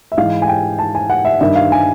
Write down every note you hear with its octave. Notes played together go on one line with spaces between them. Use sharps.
E5
G#2 E3 F5
G#5
G5
A5
G#5
F#5
E5
G2 D#3 E5
F5
G#5